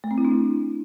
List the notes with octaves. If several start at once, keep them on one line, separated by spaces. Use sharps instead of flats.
A3
C4
E4
D4
E4